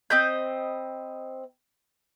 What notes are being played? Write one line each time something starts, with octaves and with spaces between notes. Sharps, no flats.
C4 D#5 B5 G6